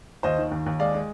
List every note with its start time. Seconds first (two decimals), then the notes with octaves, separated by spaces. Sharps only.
0.23 D#2 C5 D#5
0.38 D#3
0.51 D#2
0.66 D#2
0.79 G#3 D5 F5
0.94 G#3